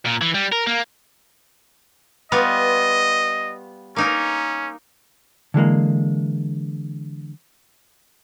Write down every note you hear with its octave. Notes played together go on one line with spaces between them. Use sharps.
A#2
E3
G3
A#4
A#3
G3 B3 F4 D#5
A#3 C#4 D#4 A#4
D3 E3 G#3 A#3